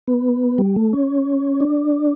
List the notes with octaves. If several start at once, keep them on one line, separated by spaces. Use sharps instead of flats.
B3
G3
A3
C#4
D4